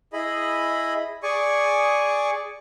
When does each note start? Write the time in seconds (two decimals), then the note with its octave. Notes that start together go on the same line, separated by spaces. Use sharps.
0.13 E4 G#4 D#5 B5
1.23 G#4 D5 G#5 C#6